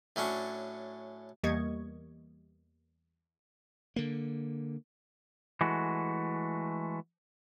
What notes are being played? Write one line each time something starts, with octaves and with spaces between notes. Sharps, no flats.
A2 F#3 C#4 D4
E2 G3 A#3 D#5 C#6 G#6
D3 A#3
E3 G#3 A3 F#4